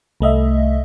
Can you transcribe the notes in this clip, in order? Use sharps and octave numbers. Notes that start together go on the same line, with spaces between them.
C2 A3 D#5 E5